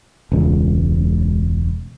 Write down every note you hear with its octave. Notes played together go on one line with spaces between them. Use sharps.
E1 C#2